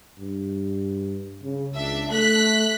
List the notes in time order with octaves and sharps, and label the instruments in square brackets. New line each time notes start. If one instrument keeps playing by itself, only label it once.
[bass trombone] G2
C#3
[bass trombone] C#2 [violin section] D4 E5
[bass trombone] A3 [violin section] F#6 B6